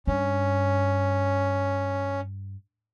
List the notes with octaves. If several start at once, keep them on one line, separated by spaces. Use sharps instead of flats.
G2 C#4